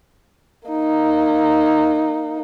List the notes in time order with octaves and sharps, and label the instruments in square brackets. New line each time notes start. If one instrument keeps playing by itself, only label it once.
[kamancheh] A#3 D#4